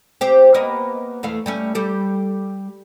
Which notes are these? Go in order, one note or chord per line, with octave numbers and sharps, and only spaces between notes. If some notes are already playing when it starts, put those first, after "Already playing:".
C4 G4 C5
A#3 B3 D#5
E2 A3 F5
G3 A3 C#4
G3 G4 A4